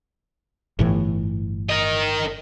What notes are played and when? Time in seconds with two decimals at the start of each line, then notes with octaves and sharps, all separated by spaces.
0.79 G1 A2 E3
1.70 A#4 D#5